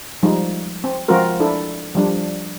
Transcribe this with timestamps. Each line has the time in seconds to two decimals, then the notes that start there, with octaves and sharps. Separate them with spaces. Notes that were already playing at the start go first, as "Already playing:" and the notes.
0.23 F3 G3 G#3 D#4
0.84 C4
1.08 F3 G#3 C4 F4 F#4 A#4
1.40 D4 E4 A4
1.95 F3 G3 D4